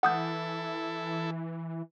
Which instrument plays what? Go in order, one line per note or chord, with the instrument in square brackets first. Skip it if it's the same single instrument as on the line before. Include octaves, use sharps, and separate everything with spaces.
[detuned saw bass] E3 [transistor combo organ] E4 A4 [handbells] F#5 D#6 G6